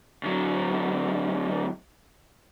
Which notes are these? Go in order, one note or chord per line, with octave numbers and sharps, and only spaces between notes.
D2 F#3